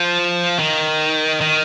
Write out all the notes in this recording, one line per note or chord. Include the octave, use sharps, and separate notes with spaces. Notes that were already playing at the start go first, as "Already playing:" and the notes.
Already playing: F3
D#3
D#3